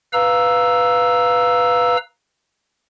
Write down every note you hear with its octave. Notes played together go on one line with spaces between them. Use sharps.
B4 F5 A#5 E6